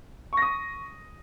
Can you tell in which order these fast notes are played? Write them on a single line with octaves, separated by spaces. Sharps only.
C#6 A#6 D#6